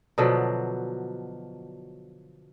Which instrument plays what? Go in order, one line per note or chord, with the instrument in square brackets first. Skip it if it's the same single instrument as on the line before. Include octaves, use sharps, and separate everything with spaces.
[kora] B2 D3 F3 F#3